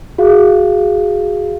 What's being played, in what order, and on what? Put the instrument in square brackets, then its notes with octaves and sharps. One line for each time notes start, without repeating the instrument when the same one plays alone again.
[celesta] F#4 G#4 F5